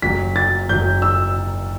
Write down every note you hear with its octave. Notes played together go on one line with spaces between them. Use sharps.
F#1 F#2 F#3 B6
A6
F#1 F#2 F#3 G6
E6